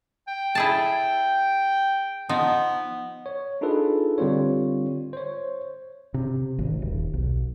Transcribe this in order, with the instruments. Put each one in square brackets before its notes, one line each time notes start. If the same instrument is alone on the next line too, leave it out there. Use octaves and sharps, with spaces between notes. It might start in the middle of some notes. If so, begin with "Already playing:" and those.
[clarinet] G5
[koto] E4 G#4 A5
[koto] F3 D#4 [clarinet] B3
[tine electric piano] C#5
D4 D#4 F4 G#4 A4 B4
D3 G3 C4 F4 C#5
C5 C#5
[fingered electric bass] C3
G#1
D#1
B1